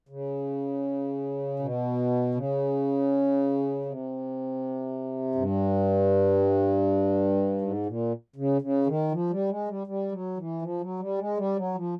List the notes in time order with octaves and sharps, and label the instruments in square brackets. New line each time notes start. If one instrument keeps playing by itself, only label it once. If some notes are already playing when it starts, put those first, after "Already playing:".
[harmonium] C#3
B2
C#3
C3
G2
G#2
A#2
C#3
C#3
D#3
F3
G3
G#3
G3
G3
F#3
E3
F3
F#3
G3
G#3
G3
F#3
F3